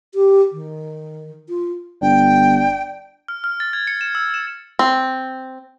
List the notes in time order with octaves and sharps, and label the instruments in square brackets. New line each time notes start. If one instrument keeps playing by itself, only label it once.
[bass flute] G4
D#3
F4
[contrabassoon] G1 [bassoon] D4 [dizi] G5
[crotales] F6
F6
A6
G#6
C#7
E7
E6
E7
[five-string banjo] C4